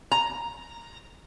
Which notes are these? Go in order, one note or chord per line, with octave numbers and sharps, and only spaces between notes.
A#5